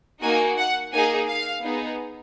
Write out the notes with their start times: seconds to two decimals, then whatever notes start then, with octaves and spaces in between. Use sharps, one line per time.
0.22 A#3 D#4 F#4 G#5
0.57 F#5
0.93 A#3 D#4 G#4 G#5
1.28 F5
1.64 B3 D#4 G#4